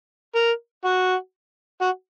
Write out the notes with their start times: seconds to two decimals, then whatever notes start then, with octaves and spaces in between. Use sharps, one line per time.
0.35 A#4
0.85 F#4
1.81 F#4